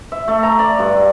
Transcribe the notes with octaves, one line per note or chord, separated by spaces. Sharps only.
E5
A3
A#5
D5
G2